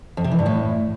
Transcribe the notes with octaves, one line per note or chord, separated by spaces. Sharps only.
F2
C3
E3
G2
A2